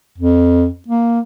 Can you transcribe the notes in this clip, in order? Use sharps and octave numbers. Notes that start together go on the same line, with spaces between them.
F2
A#3